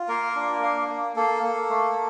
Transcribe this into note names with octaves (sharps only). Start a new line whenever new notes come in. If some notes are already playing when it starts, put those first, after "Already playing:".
Already playing: F4
A#3 A#4
D4
A#3
A#3
A#3 A4
A#3
A3